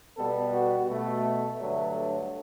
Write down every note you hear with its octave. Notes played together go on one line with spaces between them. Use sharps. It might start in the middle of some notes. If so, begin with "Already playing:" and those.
B2 G3 B3 A4
F#4
B2 A3
G2 D3 F#3 A3